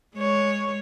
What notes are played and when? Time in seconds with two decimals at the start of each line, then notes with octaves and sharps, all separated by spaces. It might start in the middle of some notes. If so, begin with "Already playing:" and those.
0.15 G#3 C#5